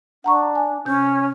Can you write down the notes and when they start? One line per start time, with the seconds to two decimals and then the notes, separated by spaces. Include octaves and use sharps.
0.24 D4 F#5 A#5 C#6
0.55 G#5
0.85 C3 C#4 G6